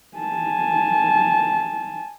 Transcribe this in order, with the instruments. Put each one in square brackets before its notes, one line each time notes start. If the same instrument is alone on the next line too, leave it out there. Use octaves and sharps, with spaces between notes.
[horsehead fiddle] G#5 A5